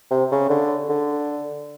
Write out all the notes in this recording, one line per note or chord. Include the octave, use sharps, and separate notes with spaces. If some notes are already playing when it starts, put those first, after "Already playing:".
C3
C#3
D3
D3